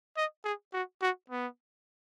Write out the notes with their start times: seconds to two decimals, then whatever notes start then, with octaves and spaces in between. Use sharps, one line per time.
0.17 D#5
0.45 G#4
0.74 F#4
1.02 F#4
1.30 B3